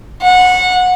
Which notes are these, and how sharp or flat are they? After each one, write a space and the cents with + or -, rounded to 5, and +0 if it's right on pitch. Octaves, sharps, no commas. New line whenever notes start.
F#5 -20